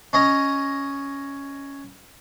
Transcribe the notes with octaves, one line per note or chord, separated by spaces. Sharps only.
C#4 D#5 A#5